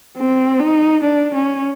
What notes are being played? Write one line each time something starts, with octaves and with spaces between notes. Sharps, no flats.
C4
D#4
D4
C#4